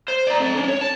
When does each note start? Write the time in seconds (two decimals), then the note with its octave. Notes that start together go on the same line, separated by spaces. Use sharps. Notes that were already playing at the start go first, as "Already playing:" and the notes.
0.08 C5
0.27 D5 A#5
0.40 C4 A4
0.55 C#4 D4
0.68 C#5
0.81 A5